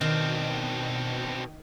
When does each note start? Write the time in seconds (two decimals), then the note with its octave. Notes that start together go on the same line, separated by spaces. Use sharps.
0.01 B2 D#3 C4 D4